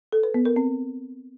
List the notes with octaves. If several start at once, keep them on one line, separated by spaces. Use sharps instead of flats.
A4
B4
B3
A#4
C4